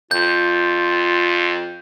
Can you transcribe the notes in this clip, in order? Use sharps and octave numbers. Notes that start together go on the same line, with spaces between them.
F2 F4 G6